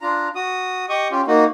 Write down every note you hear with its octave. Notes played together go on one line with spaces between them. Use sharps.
D4 F4 A#5
F#4 D#6
G4 D#5 C#6 D#6
C#4 F4 G4
A#3 D#4 F#4